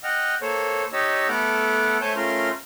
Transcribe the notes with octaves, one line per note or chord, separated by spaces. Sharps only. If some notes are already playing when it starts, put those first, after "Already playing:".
D#5 F#5 G5 F6
A#3 A4 C5 C#5
D#4 G4 C#5 D#5 E6
A3 B3 A4 F#5 D6 F6
A3 C5 C#5 G#5 A5 G6
A3 C#4 F4 A#4 C6 F6